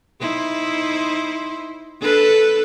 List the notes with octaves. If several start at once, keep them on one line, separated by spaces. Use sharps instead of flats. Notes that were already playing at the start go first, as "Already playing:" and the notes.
D#4 E4 C5
D4 A4 B4